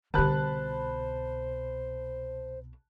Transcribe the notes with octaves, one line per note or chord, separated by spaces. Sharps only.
C2 B2 D3 G4 C5 A5 B5 F#6